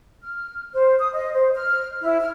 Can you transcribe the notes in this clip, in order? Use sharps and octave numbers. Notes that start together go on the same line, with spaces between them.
F6
C5
D#6
D#5
C5
F6
E4
F6